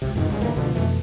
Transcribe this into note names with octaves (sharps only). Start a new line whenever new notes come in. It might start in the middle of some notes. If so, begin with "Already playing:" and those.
C#2 C3
F2 G#2 B2 D#3
C#2 G2 C#3 G#3
D#2 D3 E3 A#3
C#2 B2 D3 F3
F2 B2 E3 A3